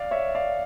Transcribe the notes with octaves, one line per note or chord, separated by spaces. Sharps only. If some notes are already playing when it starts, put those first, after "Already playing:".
Already playing: D5 F5
C#5 E5
D5 F5